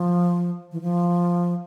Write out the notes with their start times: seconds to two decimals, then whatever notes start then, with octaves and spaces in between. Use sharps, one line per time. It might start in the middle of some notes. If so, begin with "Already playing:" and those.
Already playing: F3
0.72 E3
0.81 F3